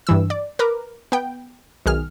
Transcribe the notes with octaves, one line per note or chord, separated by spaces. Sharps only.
G2 E3 E6
D5
A#4 B4 D6
B3 G5
B1 D#3 G#4 F6